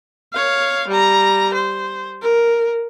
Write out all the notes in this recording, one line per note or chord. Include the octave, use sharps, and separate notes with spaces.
C#5 F5
G3 A#5
C5
A#4